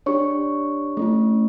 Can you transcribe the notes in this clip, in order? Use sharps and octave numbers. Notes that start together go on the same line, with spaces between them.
D4 G4 C#5 C#6
A3 C#4 E4